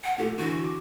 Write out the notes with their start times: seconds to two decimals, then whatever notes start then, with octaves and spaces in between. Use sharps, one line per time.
0.04 F#5
0.18 A#2 A3 G4
0.38 D3 E3 F#4
0.64 D6